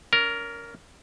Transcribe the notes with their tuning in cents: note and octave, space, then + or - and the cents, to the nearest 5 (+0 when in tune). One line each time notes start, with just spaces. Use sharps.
C#4 +40 A#4 +0